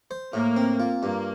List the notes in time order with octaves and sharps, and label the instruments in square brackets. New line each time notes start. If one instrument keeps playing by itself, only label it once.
[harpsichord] C5
[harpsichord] A2 [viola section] A#3
[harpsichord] C4
F4
[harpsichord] G2 [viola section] A#3